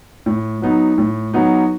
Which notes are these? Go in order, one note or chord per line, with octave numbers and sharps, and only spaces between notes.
A2
F#3 B3 D#4
A2
F#3 B3 D#4